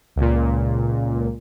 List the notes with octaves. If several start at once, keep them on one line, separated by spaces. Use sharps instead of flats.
C#2 A#2